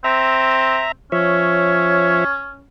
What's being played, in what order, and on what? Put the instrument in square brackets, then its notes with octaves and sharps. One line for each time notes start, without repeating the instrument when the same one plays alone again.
[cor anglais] C4 [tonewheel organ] E5 A#5
[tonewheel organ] F3 C#5 E5 [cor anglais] C#4